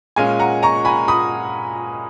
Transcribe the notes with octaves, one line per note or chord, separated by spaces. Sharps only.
A#2 G#3 C#4 F5 G#5
F#5 A#5
A#5 C#6
G#5 B5
B5 D#6